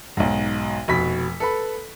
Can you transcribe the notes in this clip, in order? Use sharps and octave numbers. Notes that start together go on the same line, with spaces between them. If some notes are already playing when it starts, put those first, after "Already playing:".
B1 G#2
F1 B2 B5 B6
A4 B4 B5